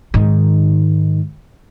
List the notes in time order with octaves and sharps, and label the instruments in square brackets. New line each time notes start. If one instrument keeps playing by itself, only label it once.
[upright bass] G#2 D#3